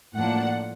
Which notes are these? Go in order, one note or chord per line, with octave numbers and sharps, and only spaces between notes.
A2 F3 A#3 D4 F#5